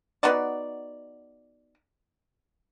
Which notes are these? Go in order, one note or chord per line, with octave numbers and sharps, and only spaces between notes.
B3 D#4 F#4 D5